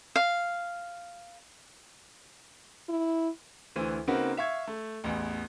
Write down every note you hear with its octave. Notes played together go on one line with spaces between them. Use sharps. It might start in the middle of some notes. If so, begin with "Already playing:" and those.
F5
E4
D2 E3 C5 D#7
C#3 A#3 C4 D#4 F#4 B4
E5 F5 C#6 G#6
A3
A1 E2